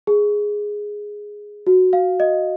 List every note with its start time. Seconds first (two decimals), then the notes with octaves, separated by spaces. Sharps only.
0.07 G#4
1.67 F#4
1.93 F5
2.20 D#5